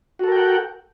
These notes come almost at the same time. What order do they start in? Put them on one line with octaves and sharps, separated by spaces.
F#4 A4 A#4 G5 F#5